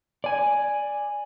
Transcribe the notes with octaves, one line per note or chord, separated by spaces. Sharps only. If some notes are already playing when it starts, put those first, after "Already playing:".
D5 G#5